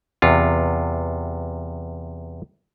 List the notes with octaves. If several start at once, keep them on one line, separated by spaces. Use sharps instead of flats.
E2 C3 F4